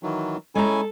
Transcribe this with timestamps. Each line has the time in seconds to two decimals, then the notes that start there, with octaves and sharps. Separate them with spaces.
0.03 D#3 E3 F#3
0.55 G#3 C#4 E4 A4 G#5 A#5